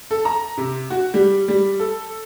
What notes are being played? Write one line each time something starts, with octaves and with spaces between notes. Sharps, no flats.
A4
A#5
C3
F#4
G3
G3
A4